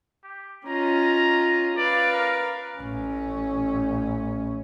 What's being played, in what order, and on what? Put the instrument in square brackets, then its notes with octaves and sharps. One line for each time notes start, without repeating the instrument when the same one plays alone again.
[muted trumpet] G4
[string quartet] C#4 F4 D#5 [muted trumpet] A#5
[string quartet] B4 F5 [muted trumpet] D5
[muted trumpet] A#4
[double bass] A1 C#4